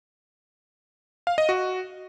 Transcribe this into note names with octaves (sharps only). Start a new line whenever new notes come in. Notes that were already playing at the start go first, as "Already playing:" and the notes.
F5
D#5
F#4